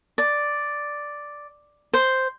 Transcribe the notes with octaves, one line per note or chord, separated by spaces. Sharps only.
D5
C5